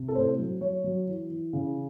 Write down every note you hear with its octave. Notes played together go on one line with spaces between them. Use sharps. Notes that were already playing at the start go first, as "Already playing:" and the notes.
Already playing: C3
A4
A2 C5
F#3
F#3 C#5
F#3
E3
E3
C#3